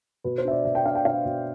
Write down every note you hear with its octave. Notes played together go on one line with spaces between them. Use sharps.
B2 B4
C5
D4 E5
D5
B2 E5
G5
D4 F5
G5
D4 F5
B2